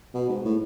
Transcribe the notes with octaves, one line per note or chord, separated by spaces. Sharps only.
B2
G#2
A2